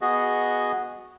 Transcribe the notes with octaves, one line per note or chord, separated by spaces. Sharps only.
B3 F#4 G#4 D#5